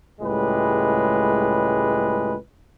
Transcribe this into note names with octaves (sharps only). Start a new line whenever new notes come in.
C#2 A2 G3 G#3 B4